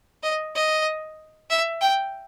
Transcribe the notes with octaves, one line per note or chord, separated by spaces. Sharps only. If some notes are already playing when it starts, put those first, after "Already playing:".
D#5
D#5
E5
G5